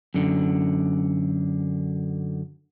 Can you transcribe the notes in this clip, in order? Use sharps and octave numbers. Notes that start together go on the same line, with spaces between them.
F#2 D3